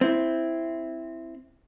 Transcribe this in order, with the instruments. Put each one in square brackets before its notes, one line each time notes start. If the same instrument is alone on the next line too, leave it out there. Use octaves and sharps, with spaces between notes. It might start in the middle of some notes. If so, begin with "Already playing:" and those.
[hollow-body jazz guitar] C4 E4